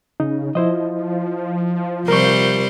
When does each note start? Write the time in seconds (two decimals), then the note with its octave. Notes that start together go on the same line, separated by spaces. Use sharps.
0.20 C#3 D#4
0.55 F3 E4 C5 D#5
2.08 C3 G3 A#4 C5 C#6